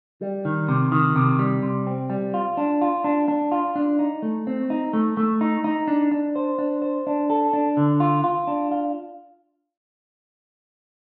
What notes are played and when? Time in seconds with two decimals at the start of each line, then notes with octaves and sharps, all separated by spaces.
0.21 G3
0.45 D#3
0.69 C3
0.92 D#3
1.16 C3
1.39 G3
1.63 C3
1.87 C4
2.10 G3
2.34 F4
2.57 D4
2.82 F4
3.04 D4
3.28 D4
3.52 F4
3.76 D4
3.99 D#4
4.22 A3
4.47 C4
4.70 D#4
4.93 A3
5.17 A3
5.41 D#4
5.64 D#4
5.88 D4
6.11 D4
6.36 C5
6.58 D4
6.82 C5
7.07 D4
7.30 A4
7.53 D4
7.77 D3
8.00 F4
8.24 F4
8.47 D4
8.71 F4